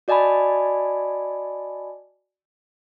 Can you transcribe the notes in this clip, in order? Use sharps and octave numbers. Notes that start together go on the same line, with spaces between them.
F#4 D5 D#5 G#5 A5 B5